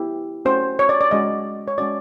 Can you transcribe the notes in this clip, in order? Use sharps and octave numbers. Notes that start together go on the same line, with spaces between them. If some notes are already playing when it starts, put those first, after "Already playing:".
Already playing: B3 E4 G4
A3 C#4 F#4 C5
C#5
D5
D5
G#3 C#4 F#4 D#5
C#5
G#3 C#4 F#4 D5